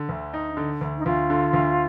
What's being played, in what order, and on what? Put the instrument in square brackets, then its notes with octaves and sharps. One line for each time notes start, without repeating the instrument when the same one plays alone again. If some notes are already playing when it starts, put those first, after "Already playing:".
Already playing: [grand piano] D3
D2
D#4
D3
D2
[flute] D#4
[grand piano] D2 [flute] F4
[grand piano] D3
D2